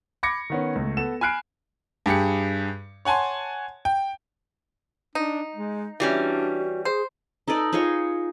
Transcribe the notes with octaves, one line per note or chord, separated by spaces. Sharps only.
B5 D6 G#6 A#6 C#7
D#3 B3 C#4
C#2 A3
B3 A4 E7
G#5 B5 F6 F#6 C7 D7
G2 G4 G#4 C#7
C#5 F#5 G#5 A5 C6
G5
D4 D#4
G#3
E3 G3 C#4 D4 F#4
G#4 C5
D#4 A4 B4 D5
D#4 F4 G#4 C#5